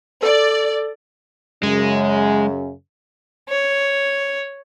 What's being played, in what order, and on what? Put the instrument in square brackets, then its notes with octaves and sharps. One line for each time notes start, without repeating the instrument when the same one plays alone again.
[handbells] A4 [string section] D5
[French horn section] F#2 C#3 [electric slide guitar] G#3
[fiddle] C#5